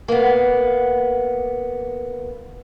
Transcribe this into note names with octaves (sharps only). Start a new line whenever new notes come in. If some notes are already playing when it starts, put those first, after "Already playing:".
A#3 B3